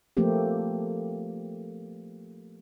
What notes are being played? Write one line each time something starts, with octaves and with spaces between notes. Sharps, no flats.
F3 A3 A#3 C4 G4